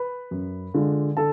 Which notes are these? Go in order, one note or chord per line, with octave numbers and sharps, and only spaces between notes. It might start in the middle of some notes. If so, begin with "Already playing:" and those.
Already playing: B4 B5
F#2
D3 G#3 D4 F4
D3 A4 A5